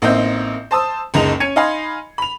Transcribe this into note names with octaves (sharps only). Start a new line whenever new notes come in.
A1 A#3 C4 D#4 E5 G6
C5 A5 D#6 E6
F#1 C#2 G#3 D#4 F7
C#4 G#6 C#7 D#7 F7
D#4 D#5 F5 G#5 B5 C6
B5 F7